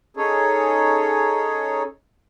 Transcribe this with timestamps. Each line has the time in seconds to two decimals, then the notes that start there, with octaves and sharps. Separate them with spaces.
0.17 C#4 D#4 G#4 A4 C#5